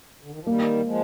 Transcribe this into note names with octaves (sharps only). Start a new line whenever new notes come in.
D3
D#3
F3
D#3 G3 A#3
F3 G#3